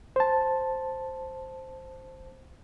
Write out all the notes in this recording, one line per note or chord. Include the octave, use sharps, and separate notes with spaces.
C5 A5